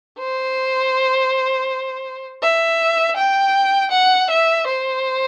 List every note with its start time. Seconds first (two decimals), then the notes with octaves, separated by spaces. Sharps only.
0.19 C5
2.42 E5
3.17 G5
3.92 F#5
4.30 E5
4.68 C5